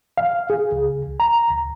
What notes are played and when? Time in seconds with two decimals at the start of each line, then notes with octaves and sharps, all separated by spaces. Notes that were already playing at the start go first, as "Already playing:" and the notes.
0.18 F5
0.50 G#4
0.72 C#2
1.20 A#5
1.50 D2